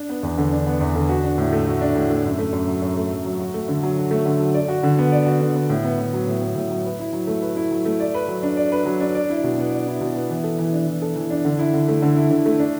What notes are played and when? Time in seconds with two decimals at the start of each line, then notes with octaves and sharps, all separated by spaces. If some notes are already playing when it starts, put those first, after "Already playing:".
Already playing: D4
0.09 B3
0.23 E2
0.38 D3
0.52 D4
0.66 B3
0.80 E2
0.95 D3
1.09 F#4
1.23 D4
1.38 A2
1.52 A3
1.67 F#4
1.81 D4
1.96 A2
2.10 A3
2.24 F#2
2.39 A3
2.53 F#2
2.68 F#3
2.82 F#2
2.97 A3
3.11 F#2
3.25 F#3
3.39 F#4
3.54 A3
3.68 D3
3.83 F#3
3.97 F#4
4.11 A3
4.26 D3
4.40 F#3
4.54 D5
4.68 F#4
4.83 D3
4.98 B3
5.12 D5
5.26 F#4
5.41 D3
5.55 B3
5.70 A2
5.84 B3
5.98 A2
6.13 F#3
6.27 A2
6.42 B3
6.56 A2
6.70 F#3
6.85 B4
6.99 E4
7.13 F#3
7.27 A3
7.42 B4
7.56 E4
7.71 F#3
7.85 A3
8.00 D5
8.14 B4
8.28 F#3
8.43 D4
8.57 D5
8.72 B4
8.85 F#3
9.01 D4
9.15 D5
9.30 E4
9.43 B2
9.58 B3
9.72 D5
9.87 E4
10.01 B2
10.15 B3
10.30 E3
10.44 A4
10.59 E3
10.73 D4
10.87 E3
11.02 A4
11.16 E3
11.30 D4
11.45 D3
11.59 E4
11.73 D3
11.88 A3
12.02 D3
12.16 E4
12.31 D3
12.46 A3
12.59 D4